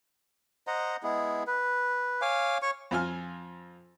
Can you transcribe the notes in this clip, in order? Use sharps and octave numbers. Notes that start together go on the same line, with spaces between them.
C5 D#5 F#5 A#5
G#3 B3 E4 G#4
B4
C#5 F5 G#5 D6
C#5 C#6
F2 F4 G#5 F6